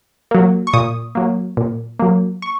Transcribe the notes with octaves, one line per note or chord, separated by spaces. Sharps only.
F#3 A#3
C#6
A#2 D#6
F#3 A#3
A#2
F#3 A#3
C#6